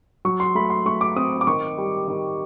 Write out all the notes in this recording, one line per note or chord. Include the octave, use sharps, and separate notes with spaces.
F#3 C#6
C6
A3 B5
C6
A3 C#6
D6
C4 D#6
D6
D#3 C#6
G3
D#3